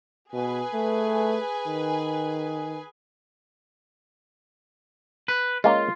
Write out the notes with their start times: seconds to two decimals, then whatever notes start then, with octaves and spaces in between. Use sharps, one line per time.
0.33 B2 G#4 B4 G#5
0.74 A3
1.66 D#3
5.28 B4
5.64 G#3 A#3 C#4 F4